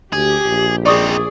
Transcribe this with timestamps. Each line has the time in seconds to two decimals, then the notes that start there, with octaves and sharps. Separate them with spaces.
0.13 D2 G4 G#4
0.46 A#1
0.86 C4 D#4 G#4 D5 C#6 D#6